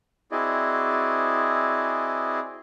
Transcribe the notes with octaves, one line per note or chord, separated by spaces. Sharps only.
C4 E4 F#4 G#4 D5 D#5